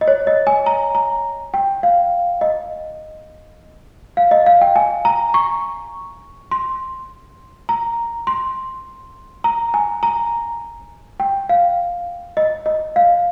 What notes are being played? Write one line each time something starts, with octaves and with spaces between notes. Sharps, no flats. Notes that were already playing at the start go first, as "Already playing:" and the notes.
D#5
C#5
D#5
G#5
A#5
A#5
G5
F5
D#5
F5
D#5
F5
G5
G#5
A#5
C#6
C6
A#5
C6
A#5
G#5
A#5
G5
F5
D#5
D#5
F5